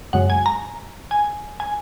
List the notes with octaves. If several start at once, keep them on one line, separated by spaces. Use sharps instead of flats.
F#2 C#3 G#3 F#5
G#5
A#5
G#5
G#5